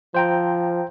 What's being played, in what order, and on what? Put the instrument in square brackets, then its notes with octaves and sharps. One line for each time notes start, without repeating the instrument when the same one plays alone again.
[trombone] F3 [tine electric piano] C5 G5 A#5